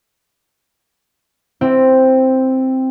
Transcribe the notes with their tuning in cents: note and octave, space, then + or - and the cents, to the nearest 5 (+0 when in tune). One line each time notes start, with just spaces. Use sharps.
C4 +0 E4 +0